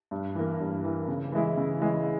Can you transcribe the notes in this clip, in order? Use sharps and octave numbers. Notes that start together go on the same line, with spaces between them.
G2
E3 A#3
G2
E3 A#3
C#3
E3 G#3 E4
C#3
E3 G#3 E4